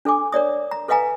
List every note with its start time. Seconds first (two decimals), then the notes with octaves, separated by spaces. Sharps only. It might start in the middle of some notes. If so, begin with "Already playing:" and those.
0.05 D4 A4 G#5 D6
0.32 A#4 C#5 D5 D#6
0.71 A#5
0.88 A4 B4 D#5 F5 G#5 A#5